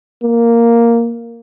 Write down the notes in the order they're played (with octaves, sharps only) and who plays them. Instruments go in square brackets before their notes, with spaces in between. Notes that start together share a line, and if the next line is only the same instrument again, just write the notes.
[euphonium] A#3